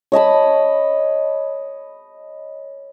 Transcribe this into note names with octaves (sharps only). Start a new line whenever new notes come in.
C#5 D#5 A5 B5